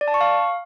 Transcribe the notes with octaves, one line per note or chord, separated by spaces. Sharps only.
D5
A5
C#6
F5